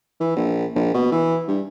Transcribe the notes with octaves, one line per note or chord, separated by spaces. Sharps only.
E3
A#1
A#1
B2
E3
G2